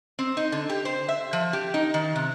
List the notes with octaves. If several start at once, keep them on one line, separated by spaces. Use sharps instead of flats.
C4
D#4
D3
G4
C5
E5
F3
G4
D#4
D#3
C3